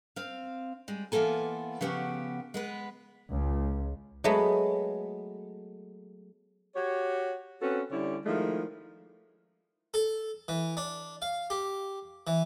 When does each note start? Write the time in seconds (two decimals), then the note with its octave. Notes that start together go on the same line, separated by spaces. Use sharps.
0.16 C4 F5
0.88 G3 G#3
1.12 E3 A#3 B3 F4 A4 G#5
1.81 C#3 F3 B3 F#4 G4
2.54 G#3 B3 B4
3.33 C#2
4.24 F#3 G#3 A3 B3
6.76 F#4 G4 C#5
7.62 C4 C#4 F#4 A4 B4
7.91 D3 G3 C#4 E4 D5
8.26 D#3 F3 G#3 A3 E4
9.94 A4
10.48 E3
10.77 D4
11.22 F5
11.50 G4
12.27 E3